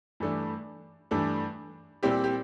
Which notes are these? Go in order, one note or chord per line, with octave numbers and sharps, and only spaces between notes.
G2 E3 A3 D4
G2 E3 A3 D4
A#2 G3 C4 E4 G4
G4